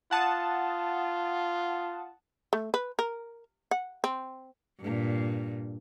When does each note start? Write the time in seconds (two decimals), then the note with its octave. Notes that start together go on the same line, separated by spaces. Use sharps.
0.11 F4 F#5 A5 D#6
2.53 A3
2.74 B4
2.99 A#4
3.71 F#5
4.04 C4
4.80 G2 A#2